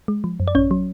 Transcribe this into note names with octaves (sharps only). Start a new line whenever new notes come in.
G#3
F3
F#2
D5
A1 C#4 C#5
F#3